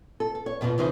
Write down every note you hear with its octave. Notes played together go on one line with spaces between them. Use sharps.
A4
A4
C#5
F2 B2 E3 F3
F2 C#3 E3 D#4 C5